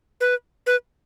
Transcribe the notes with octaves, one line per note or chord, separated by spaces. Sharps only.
B4
B4